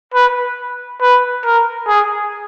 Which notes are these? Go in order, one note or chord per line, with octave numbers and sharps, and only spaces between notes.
B4
B4
A#4
G#4